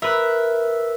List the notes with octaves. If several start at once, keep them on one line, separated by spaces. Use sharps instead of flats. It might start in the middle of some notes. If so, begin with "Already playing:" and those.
A#4 B4 E5